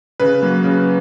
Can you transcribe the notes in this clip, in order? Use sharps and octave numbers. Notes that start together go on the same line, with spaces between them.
C#3 B4
F#3 A#3
C#3